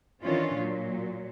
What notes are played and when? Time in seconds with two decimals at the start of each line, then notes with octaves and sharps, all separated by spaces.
0.23 D#3 E3 C#4 D4 F4
0.55 A#2 F#3